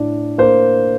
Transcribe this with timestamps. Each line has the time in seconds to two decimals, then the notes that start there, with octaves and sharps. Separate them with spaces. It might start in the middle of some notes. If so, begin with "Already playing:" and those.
Already playing: A2 D4
0.38 A#3 C5